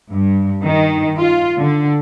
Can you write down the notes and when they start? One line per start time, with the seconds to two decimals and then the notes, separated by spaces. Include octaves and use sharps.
0.11 G2
0.63 D#3
1.18 F4
1.58 D3